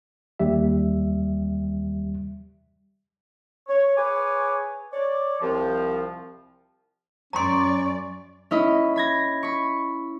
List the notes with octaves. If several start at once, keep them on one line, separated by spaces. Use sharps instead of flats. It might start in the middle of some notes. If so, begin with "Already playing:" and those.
D#2 G3 G4 E5
C#5
G#4 B4 C#5 G#5 D6
C#5 D5
C2 F3
F#2 C#4 D5 A#5 C6 C#6
C#4 E4 D#5 B5
B5 G#6 A#6
B5 C#6